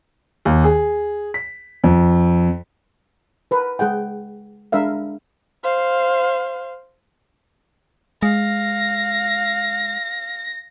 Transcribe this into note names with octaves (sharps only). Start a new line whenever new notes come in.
D#2
G#4
B6
F2
A#4 B4
G#3 G#4 F#5 G5
G#3 D4 A#4 E5 F5
C5 F5
G#3 F5 A#6